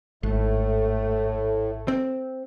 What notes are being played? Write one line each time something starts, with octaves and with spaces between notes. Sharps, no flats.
G#1 A2 A3
C4